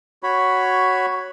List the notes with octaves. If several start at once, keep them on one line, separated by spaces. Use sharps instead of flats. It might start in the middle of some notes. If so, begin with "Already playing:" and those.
F#4 C#5 B5